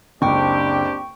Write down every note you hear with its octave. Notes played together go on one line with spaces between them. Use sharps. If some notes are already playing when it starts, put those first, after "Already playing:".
F#1 C#2 C4 D4 G4 G5 C#6